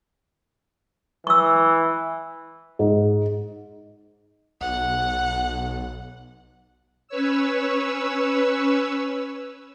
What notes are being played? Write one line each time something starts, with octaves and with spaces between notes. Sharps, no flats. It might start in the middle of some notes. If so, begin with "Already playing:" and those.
E3 C#6 E6
G#2
B1 F#5
C#4 B4 C#5 E6